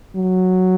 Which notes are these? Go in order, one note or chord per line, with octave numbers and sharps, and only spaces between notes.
F#3